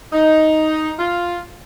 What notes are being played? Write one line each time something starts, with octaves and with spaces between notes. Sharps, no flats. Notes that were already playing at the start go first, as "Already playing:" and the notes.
D#4
F4